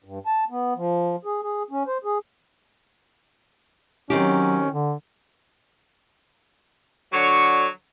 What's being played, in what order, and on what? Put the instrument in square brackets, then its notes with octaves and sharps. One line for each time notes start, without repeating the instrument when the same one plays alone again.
[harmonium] G2
A5
B3
F3
G#4
G#4
C#4
C5
G#4
[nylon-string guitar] D#3 C4 G4 [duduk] F#3 [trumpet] C#4
[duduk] D3
[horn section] D3 F#3 C#5